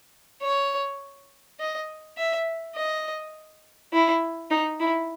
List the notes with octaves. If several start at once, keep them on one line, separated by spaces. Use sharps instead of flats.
C#5
D#5
E5
D#5
E4
D#4
E4